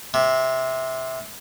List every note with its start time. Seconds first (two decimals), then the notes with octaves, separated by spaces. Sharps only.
0.14 C3